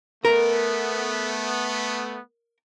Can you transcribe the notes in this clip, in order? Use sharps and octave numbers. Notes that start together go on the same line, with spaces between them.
A3 B3 A#4